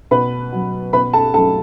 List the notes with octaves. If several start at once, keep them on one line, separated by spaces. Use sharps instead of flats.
B2 B4 B5
F#3
B2 B4 B5
A4 A5
F#3 A4 A5